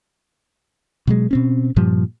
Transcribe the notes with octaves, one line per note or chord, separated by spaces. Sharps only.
B2 F#3 G#3
B2 C4 C#4
G2 A#2 F3 G3